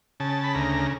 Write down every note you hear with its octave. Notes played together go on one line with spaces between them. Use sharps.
C#3 A5
B5
D2 A#5